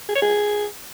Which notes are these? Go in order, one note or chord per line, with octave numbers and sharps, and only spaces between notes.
G#4
C#5
G#4